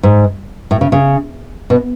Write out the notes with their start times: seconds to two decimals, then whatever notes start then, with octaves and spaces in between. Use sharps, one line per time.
0.03 G#2
0.71 A2
0.81 C#3
0.92 C#3
1.70 B2